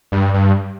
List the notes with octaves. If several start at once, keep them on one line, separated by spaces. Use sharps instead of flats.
G2
G2